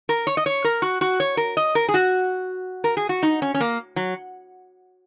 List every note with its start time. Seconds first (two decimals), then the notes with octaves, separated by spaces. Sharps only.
0.09 A#4
0.27 C#5
0.37 D#5
0.46 C#5
0.64 A#4
0.82 F#4
1.01 F#4
1.20 C#5
1.37 A#4
1.57 D#5
1.75 A#4
1.89 G#4
1.94 F#4
2.84 A#4
2.97 G#4
3.09 F#4
3.23 D#4
3.42 C#4
3.54 C#4
3.60 A#3
3.96 F#3